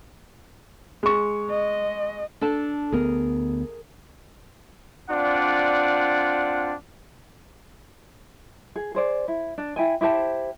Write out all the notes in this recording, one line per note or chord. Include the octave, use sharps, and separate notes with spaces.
G#3 C#6
D#5
D4 A4 A5
D2 B3 G#4 A#4
C4 D4 F4 D5 F#5
G#4
G#4 C5 D5
E4
D4
E4 G5 G#5
E4 G4 C5 A5